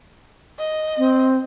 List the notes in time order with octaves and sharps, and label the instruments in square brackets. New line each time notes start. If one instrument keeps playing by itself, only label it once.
[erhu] D#5
[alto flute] C4